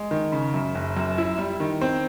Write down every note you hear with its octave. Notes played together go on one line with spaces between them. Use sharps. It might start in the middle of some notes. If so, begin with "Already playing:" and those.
Already playing: G#3
D#3
C#3
F#2
F#1
F#2
E4
G3
D#3
C4